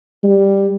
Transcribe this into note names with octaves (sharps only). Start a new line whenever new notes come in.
G3